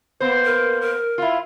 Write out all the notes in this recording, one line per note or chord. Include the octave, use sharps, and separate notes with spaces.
A#3 B3 C5
A#4
A#4
E4 F4